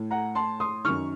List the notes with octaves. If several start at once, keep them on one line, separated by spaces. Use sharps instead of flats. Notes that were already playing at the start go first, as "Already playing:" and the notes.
Already playing: A2
F#5 A#5
A5 C6
C6 D#6
F#2 D#3 C#6 F6